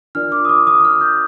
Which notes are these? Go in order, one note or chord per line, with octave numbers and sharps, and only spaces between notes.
D4 F4 A#4 D5 F6
D6
D#6
D6
D#6
F6
G6